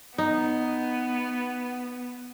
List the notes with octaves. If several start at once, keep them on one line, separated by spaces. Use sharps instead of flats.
B3 D#4